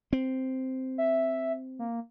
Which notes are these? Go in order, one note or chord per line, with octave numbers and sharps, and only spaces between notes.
C4
E5
A#3